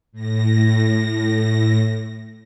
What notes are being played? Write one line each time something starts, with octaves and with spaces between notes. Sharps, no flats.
A2 A#6